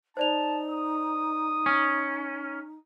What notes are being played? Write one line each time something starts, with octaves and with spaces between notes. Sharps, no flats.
D#4 C5 D5 A5 F7
D#6
C#4